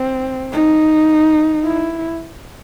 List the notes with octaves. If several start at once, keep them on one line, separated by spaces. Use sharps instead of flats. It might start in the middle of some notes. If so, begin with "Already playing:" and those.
Already playing: C4
D#4
E4